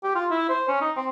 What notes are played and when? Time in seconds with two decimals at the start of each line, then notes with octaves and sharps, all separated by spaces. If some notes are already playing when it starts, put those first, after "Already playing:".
0.04 G4
0.15 F4
0.31 E4
0.49 C5
0.69 C#4
0.81 D#4
0.97 C4